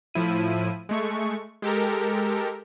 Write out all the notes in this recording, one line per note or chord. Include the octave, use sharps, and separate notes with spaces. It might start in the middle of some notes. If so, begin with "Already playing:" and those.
A2 F3 E4 D#7
G#3 A3 C#6
G#3 G4 A4 A#4